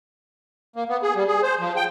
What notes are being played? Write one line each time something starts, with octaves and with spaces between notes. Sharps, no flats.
A#3
B3
G#4
G3
G#4
C5
F3
G5